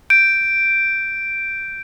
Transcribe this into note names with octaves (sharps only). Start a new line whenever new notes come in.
G6 D7